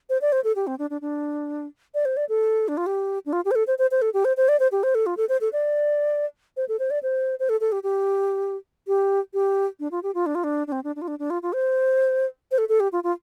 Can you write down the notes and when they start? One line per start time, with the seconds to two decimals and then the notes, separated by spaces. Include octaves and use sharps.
0.10 C5
0.21 D5
0.32 C5
0.44 A4
0.56 G4
0.67 C4
0.79 D4
0.90 D4
1.01 D4
1.94 D5
2.05 C5
2.17 D5
2.29 A4
2.68 D4
2.77 F4
2.86 G4
3.26 D4
3.33 F4
3.45 G4
3.51 C5
3.55 A4
3.67 C5
3.79 C5
3.91 C5
4.02 A4
4.14 G4
4.25 C5
4.37 C5
4.49 D5
4.60 C5
4.72 G4
4.83 C5
4.95 A4
5.06 F4
5.17 A4
5.29 C5
5.41 A4
5.53 D5
6.57 C5
6.69 A4
6.79 C5
6.91 D5
7.03 C5
7.40 C5
7.49 A4
7.61 A4
7.72 G4
7.83 G4
8.88 G4
9.34 G4
9.80 D4
9.91 F4
10.03 G4
10.15 F4
10.26 D4
10.35 F4
10.44 D4
10.67 D4
10.72 C4
10.84 D4
10.96 D4
11.02 F4
11.08 D4
11.19 D4
11.30 F4
11.43 F4
11.53 C5
12.51 C5
12.58 A4
12.69 A4
12.80 G4
12.92 F4
13.04 F4